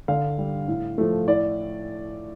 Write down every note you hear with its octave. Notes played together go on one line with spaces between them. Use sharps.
D3 F5
G3
A2
F3 A3
A2 D5